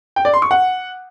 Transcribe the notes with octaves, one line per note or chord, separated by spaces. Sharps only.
G5
D5
C6
C#6
F#5